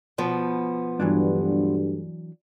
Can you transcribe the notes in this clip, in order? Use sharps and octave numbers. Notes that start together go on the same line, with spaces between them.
B2 F3 B3
D2 G2 E3 F#3 D4